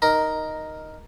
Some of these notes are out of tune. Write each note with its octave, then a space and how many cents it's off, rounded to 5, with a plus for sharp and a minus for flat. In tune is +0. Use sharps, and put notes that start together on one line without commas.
D#4 +0 A#4 +0